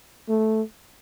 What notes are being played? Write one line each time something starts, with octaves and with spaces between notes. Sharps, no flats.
A3